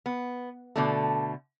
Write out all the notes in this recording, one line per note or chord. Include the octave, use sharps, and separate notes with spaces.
B3
B2 D3 A3